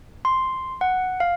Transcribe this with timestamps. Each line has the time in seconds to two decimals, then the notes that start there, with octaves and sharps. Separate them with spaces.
0.25 C6
0.81 F#5
1.20 F5